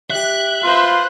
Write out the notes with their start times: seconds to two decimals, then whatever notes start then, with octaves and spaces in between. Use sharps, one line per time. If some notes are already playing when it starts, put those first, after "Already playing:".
0.10 G4 E5 F#6
0.64 F4 B4 C5